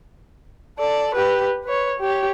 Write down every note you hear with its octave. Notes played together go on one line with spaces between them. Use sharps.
A4 D5
G4 B4
B4 C#5
G4 C#5